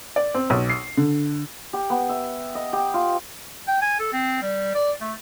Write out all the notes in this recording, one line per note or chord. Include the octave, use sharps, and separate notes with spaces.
D5
C4
B1
C7
D3
G4
B3
E5
D#5
G4
F4
G5
G#5
A4
C4
G3
D5
A3